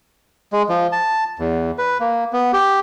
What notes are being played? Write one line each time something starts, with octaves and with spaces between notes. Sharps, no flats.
G#3
F3
A5
E2
B4
A#3
B3
G4